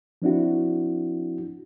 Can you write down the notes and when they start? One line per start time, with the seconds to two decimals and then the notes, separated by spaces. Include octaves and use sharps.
0.22 F3 C4 D4 E4 F#4